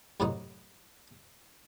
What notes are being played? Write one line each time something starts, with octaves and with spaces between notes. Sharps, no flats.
F#2 A2 C3 F#3 D#4 F#4